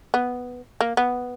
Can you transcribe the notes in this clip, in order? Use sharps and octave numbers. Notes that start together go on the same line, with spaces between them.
B3
A#3
B3